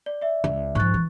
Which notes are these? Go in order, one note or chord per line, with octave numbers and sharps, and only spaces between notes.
D5
D5 E5
C#2
F2 G#2 C#6 F#6 A6
E3